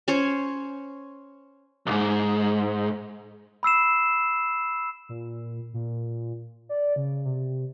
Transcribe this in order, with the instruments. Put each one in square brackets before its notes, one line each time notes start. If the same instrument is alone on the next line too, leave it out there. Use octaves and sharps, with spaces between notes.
[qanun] C#4 C5 C#5
[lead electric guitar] B1 G#2
[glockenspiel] B5 E6 C7 E7
[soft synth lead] A#2
A#2
D5
C#3
C3